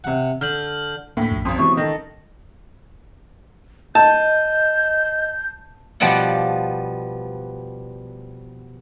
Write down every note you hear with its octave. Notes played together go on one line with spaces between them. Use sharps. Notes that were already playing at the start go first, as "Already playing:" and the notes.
C3 F#5
D3 F6 G6 F#7
D2 A2 A#3 B6
A#1 F#2
G#1 F2 C4 C6 D#6
C3 E3 F#3 G#3 B3 C#6
C#2 D#3 A4 D#5
D#5 A5 G6
B2 F3 G3 B3 D5 F#5